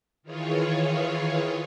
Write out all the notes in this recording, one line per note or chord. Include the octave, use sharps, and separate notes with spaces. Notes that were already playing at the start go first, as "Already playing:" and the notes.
D#3 E3 F4 G#4 C#5